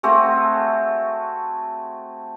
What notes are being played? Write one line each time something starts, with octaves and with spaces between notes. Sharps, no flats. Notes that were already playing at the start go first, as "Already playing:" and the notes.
A3 C4 F#4 G#4